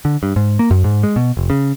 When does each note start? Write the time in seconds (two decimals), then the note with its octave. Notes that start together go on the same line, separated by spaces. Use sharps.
0.05 D3
0.23 G2
0.36 G#2
0.59 A#3
0.71 F#2
0.84 G#2
1.03 G#3
1.16 B2
1.37 F1
1.50 C#3